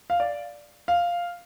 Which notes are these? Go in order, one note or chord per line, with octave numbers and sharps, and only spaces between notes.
F5
D5
F5